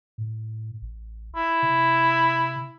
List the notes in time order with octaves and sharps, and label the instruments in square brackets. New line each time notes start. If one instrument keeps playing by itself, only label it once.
[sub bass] A2
A1
[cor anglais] E4
[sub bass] C3